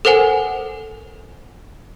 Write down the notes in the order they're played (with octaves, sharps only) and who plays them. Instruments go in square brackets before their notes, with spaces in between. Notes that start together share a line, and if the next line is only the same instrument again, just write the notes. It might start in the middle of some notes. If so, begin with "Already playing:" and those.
[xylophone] A4 A#4 C5 F#5 G#5